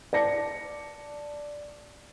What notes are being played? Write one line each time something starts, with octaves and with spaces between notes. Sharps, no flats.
D5 A5 A#6 C#7